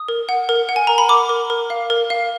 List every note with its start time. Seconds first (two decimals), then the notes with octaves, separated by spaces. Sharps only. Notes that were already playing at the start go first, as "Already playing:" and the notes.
Already playing: D#6
0.08 A#4
0.29 F#5
0.49 A#4
0.69 F#5
0.76 G#5
0.87 A#4 A#5
0.98 B5
1.09 A#4 D6
1.29 A#4
1.50 A#4
1.70 F5
1.90 A#4
2.10 F5